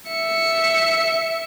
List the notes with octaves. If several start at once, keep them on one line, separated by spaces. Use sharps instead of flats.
E5 C#7